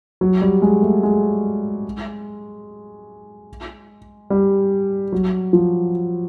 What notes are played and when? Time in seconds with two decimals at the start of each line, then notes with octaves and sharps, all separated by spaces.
0.21 F#3
0.42 G3
0.62 G#3
0.82 A3
1.03 G#3
4.30 G3
5.12 F#3
5.53 F3